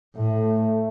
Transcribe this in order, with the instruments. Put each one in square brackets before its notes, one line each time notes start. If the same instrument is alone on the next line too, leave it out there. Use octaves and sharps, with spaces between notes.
[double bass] A2 [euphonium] A3